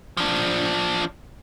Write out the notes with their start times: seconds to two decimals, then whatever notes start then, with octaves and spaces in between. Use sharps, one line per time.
0.17 F3 D4